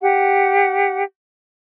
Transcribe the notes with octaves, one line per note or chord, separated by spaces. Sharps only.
G4 F#5